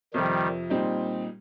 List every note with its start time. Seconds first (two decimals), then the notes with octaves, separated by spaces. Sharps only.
0.13 F2 C3 D#3 F3 G3
0.70 A#2 G3 C4 D#4